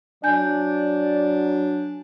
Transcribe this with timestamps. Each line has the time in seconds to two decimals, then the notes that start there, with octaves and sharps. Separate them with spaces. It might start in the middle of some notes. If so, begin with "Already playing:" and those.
0.24 F#3 D4 D5 G#5 G6